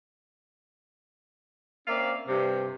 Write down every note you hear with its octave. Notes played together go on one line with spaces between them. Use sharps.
A#3 C4 C#4 D5 E5 F5
G2 C3